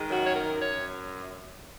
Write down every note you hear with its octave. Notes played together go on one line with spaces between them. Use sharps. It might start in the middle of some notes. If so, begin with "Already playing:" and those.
Already playing: D#3 G#3
F#2 F#4
C#5
A#4
F#2
C#5